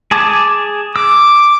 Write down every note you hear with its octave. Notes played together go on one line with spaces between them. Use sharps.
G#4 A5 D6
D6 E6